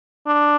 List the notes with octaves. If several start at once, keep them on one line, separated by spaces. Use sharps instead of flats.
D4